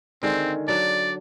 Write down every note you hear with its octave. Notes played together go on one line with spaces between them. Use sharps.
D3 D#3 G#3 C4
F#3 D4 D5